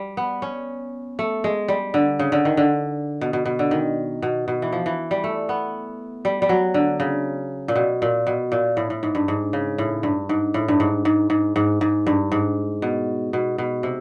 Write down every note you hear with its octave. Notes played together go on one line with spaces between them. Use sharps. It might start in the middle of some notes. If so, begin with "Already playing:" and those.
Already playing: G3
B3
C#4
A3
G#3
G3
D3
C#3
D3
D#3
D3
B2
B2
B2
D3
D#3
B2
B2
E3
F3
E3
G3
A3
B3
G3
G3
F#3
D3
C#3
A#2
B2
A#2
B2
A#2
A2
A2
G#2
G2
G#2
C#3
A2
G2
G#2
A2
G2
G#2
G#2
G#2
G#2
G#2
G2
G#2
B2
B2
B2
C3